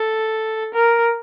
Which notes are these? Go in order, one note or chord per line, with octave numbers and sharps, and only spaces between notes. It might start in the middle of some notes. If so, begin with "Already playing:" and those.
Already playing: A4
A#4